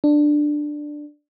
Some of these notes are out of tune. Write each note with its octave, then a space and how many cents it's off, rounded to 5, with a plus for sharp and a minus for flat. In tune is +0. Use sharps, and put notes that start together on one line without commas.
D4 +10